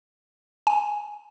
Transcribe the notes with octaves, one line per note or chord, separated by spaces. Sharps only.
G#5